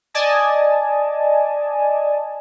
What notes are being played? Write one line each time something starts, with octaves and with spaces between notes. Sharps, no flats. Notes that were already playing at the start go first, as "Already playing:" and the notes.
D5 D#5 G#5 A5